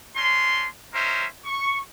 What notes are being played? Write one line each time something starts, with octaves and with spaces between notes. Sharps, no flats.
C#4 D4 C6
C#4 D#4 A#4 C5 E5
C#6